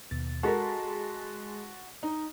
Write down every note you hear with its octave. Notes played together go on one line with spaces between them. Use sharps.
D#2 B2 A6
G#3 F#4 A4 A#4 A5 A6 B6
D#4